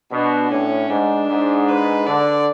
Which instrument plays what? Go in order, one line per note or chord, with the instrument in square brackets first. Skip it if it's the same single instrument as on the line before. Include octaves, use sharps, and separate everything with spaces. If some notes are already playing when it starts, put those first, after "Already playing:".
[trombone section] B2 [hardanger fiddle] D4
[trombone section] A2 [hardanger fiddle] C#4
[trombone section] G#2 [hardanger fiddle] D4
[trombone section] G#2
[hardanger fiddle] B4
[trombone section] D3 [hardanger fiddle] D5